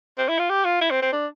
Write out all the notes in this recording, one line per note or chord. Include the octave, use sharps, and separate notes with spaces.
C4
E4
F4
G4
F4
E4
C4
C4
D4